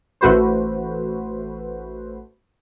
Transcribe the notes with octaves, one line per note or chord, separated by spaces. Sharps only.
A1 A3 F#4 B4 C5